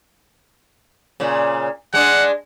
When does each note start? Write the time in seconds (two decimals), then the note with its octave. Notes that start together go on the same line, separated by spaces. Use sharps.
1.20 A#2 C#3
1.94 G#3 D4 F#5